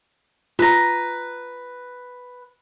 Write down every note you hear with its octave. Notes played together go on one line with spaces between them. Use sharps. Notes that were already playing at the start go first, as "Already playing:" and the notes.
F4 B4 A#5